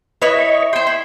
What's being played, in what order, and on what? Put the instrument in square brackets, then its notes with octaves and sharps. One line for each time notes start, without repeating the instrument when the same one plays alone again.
[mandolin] E4 C#5 [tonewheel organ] B4 D#5
[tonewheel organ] D#5 C#6
[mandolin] C5 G5 [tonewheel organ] C6
[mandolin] E4